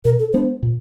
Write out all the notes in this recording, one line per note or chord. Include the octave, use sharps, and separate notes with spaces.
B2 A#4
A4
G#3 B3 D4 C5
A#2